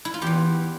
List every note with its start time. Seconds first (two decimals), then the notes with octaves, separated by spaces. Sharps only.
0.05 E4
0.14 F4
0.22 E2 E3 G4